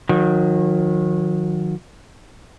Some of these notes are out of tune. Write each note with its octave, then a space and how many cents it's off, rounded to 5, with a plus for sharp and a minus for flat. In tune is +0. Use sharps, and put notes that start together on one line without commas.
D#3 +0 F#3 -35